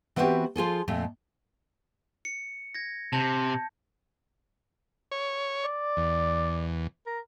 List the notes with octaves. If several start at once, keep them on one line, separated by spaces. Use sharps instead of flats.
E3 B3 C4 D4 F#4 G4
F3 F4 G#4 A4
F2 A#2 A3
C#7
G#6 A#6
C3 A5 G6
C#5
D5
E2
A#4